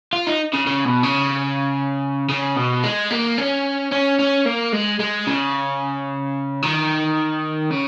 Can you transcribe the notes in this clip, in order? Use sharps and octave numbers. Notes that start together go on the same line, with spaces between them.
F4
D#4
C#3
C#3
B2
C#3
C#3
B2
G#3
A#3
C#4
C#4
C#4
A#3
G#3
G#3
C#3
D#3
C#3